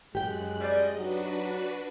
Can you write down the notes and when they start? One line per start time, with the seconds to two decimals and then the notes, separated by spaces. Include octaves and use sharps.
0.15 F#2 G#3 G4 G5 F#6
0.60 G3 C5 D5 D#5
0.98 F#3 D4 D#4 F#4 B4